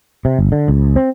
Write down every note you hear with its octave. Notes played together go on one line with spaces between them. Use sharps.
C3
G1
D3
C#2
C4